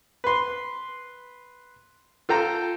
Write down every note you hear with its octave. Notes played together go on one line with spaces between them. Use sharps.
B4 C6
F4 A4 G5 A#5